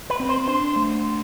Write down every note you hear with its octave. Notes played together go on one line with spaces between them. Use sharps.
B4
C4
C5
D4 C5
A3